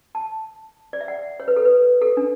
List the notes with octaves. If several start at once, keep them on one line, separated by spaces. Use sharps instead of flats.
A5
D5
E5
F#5
C#5
B4
A4
B4
A4
D4